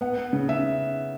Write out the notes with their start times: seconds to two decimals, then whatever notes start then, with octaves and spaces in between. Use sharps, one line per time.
0.01 B3 F#5
0.18 B3
0.33 C#3
0.49 C#3 E5